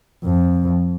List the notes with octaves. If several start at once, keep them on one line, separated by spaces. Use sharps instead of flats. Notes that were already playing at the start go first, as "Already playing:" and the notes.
F2